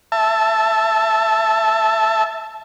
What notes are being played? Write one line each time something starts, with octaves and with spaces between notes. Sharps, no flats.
E5 A5